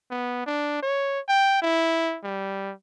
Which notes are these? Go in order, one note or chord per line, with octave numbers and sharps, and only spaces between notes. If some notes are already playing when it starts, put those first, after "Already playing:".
B3
D4
C#5
G5
E4
G3